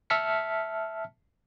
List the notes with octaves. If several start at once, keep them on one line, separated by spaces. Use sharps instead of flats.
E5 A5 F6 B6 C#7